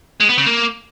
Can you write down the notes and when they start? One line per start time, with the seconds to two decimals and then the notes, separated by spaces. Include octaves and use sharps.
0.20 G#3
0.29 B3
0.37 C#3
0.46 A#3